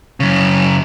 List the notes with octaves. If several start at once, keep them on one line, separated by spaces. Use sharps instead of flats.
F#2 C#3